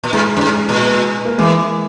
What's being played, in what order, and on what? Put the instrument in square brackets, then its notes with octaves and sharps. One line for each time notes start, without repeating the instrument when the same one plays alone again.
[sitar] A#2
[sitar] G#2 [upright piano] G#3
[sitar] F#2
G#2
A#2
[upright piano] A#3
[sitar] E3 [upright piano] G#3